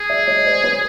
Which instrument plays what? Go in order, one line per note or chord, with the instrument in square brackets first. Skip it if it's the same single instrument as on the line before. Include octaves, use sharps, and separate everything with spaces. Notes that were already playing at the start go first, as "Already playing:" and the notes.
Already playing: [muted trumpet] G#4
[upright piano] D5 E5
C#5 D#5
C5 D5
B4 C#5